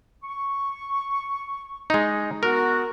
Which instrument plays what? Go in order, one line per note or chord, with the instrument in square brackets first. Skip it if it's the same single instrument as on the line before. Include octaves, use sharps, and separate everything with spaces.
[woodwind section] C#6
[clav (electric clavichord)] G#3 D#4
[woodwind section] B3 F#4 [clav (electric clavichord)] A#4